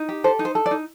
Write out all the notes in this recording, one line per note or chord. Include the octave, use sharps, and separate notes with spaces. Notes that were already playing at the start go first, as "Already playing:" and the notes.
Already playing: D#4
G4
A4 C5
D#4
C5
A4
D5
D#4